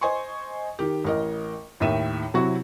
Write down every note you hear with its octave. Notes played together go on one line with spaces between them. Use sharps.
C5 D#5 G#5 C6 C#6
D#3 G4
A1 A#4 D#5
D#2 A2 D#3 E5 D#7 E7
C3 F#3 E4 F#4